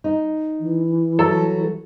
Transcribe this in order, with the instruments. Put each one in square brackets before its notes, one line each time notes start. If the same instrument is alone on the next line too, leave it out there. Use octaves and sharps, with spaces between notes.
[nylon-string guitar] D#4
[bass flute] E3
[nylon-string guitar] F#3 E4 [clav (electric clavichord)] A4